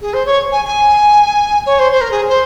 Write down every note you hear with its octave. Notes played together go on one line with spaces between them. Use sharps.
G#4
C5
C#5
G#5
G#5
C#5
C5
C5
A#4
G#4
C5